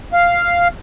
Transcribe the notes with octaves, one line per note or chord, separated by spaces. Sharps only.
F5